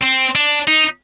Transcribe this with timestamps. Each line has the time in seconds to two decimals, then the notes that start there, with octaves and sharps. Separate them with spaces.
0.03 C4
0.35 D4
0.67 D#4